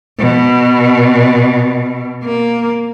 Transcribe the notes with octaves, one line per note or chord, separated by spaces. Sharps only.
B2
A#3